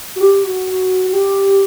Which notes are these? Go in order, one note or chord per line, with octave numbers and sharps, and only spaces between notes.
F#4
G4
F#4
F#4
F#4
G4